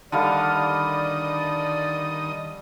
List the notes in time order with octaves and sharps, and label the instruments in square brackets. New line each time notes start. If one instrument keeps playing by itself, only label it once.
[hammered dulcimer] D3 G3 F5 [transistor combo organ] D#3 D#5 D#6 [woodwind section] D5